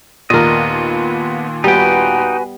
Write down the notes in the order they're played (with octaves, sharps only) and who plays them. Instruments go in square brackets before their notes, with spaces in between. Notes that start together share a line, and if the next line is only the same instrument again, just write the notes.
[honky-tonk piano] D#2 A#2 [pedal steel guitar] B3 D#5 [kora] A#4 D5
[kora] G3 B3 [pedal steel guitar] D#4 G5 [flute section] F#4 B4 G#5